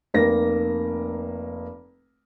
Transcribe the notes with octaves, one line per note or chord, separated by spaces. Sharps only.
F1 A#3 A#6